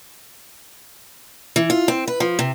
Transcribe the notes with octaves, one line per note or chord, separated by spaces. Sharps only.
E3
F4
C4
B4
F3
C3